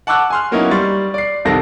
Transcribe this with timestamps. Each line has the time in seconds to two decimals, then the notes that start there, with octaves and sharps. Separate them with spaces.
0.07 F#5 A5 C#6 D6 E6 F#6
0.30 G#5 C6 F6
0.51 F#3 A#3 B3 C#4 D#4 E4
0.71 G3 C6 C#6 A6
1.14 D5 C7
1.45 C2 C3 D#3 A4 A5 A#6